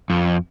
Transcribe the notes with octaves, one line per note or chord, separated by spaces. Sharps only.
F2